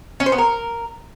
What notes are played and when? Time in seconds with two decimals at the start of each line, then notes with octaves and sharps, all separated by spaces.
0.20 C#4
0.26 C5
0.32 B3
0.38 A#4